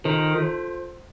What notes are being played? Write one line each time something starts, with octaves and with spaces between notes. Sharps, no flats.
D#3 F4 A4 C5
F4 A4 C5